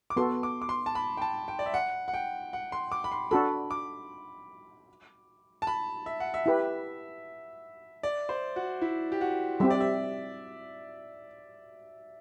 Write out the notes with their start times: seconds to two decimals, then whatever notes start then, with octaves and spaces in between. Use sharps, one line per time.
0.10 D6
0.17 B3 F#4 A4 C6
0.43 D6
0.62 D6
0.69 C6
0.86 A5
0.95 B5
1.17 G5
1.22 A5
1.48 G5
1.59 D5
1.66 E5
1.74 F#5
2.08 F#5
2.14 G5
2.53 F#5
2.72 C6
2.92 D6
3.04 B5
3.12 C6
3.31 D4 F#4 A4 B5
3.71 D6
5.62 A5
5.67 B5
6.06 E5
6.20 F#5
6.34 E5
6.46 E4 G4 B4
8.03 D5
8.29 C5
8.56 F#4
8.82 E4
9.12 G4
9.21 F#4
9.60 G3 C4 G4 E5
9.71 D5
9.80 E5